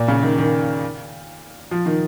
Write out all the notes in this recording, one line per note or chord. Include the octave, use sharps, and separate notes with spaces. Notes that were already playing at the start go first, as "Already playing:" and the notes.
Already playing: A#2
C#3
D#3
D#3
F3
D#3